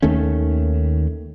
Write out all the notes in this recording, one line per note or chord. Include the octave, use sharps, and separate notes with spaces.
D#2 D#3 A3 C#4